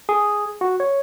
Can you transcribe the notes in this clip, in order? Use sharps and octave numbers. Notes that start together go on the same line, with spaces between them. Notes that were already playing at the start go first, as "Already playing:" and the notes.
G#4
F#4
C#5